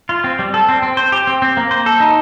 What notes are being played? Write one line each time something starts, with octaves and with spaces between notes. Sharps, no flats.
F4
C4
G3
A4
C4
C4
C5
G4
C4
C4
A#3
C5
A4
D#4